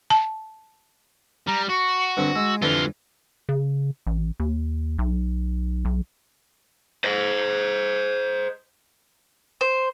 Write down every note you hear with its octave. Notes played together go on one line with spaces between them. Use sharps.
A5
G3 A#5
F#4 C#6
G2 D3 C4
G#3 E6
F2 D3 E3 G3 F4 G7
C#3
A1
D#2
B1
B1
C5 D#5
C5